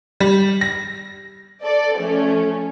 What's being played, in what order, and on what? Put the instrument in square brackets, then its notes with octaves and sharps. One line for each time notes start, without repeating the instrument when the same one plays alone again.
[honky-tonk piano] G3
A#6
[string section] A4 D5
F3 A3 C#4